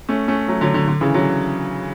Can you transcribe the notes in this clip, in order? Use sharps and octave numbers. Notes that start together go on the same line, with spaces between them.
A3 C#4
A3 C#4
F#3 A3
D3 F#3
D3
D3
C#3 E3
D3 F#3